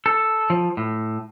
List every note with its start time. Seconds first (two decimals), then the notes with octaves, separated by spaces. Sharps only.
0.06 A4
0.50 F3
0.77 A2